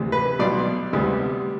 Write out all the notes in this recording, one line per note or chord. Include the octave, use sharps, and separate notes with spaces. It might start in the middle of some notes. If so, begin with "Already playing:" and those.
Already playing: D2 C3 E3 A3
B4
B1 B2 G3 D5
D2 C3 G3 B3